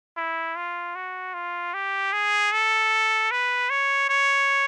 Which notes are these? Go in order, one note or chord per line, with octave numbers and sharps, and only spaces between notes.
E4
F4
F#4
F4
G4
G#4
A4
B4
C#5
C#5